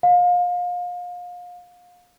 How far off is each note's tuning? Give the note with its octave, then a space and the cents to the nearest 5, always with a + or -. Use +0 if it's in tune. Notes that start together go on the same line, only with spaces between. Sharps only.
F5 +30